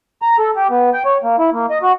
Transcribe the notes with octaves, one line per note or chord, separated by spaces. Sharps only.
A#5
A4
G4
B3
G5
C#5
A#3
E4
A#3
D#5
F#4